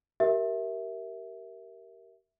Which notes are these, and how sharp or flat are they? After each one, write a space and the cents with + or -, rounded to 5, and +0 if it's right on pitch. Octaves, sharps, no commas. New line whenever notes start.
G4 -30 A#4 +0 E5 -5